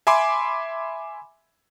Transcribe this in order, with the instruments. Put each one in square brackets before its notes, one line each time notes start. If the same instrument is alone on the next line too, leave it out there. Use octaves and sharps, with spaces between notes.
[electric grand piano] E5 G#5 B5 C6 D6